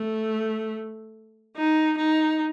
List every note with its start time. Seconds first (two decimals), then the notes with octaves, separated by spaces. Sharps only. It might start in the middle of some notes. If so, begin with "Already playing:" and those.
Already playing: A3
1.56 D#4
1.98 D#4